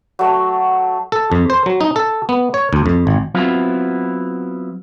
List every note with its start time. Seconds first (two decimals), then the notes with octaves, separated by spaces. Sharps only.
0.19 F#3 A3
1.12 A4
1.32 F2
1.50 C5
1.66 F#3
1.81 D#4
1.96 A4
2.29 B3
2.54 C#5
2.73 D2
2.86 F2
3.07 G#1
3.35 F#3 B3 C4 E4 F4